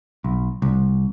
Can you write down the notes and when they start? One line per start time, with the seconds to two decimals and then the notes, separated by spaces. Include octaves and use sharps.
0.24 B1
0.62 C2